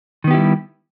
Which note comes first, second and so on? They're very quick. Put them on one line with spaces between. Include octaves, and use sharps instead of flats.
D#3 B3 G4 E4 G3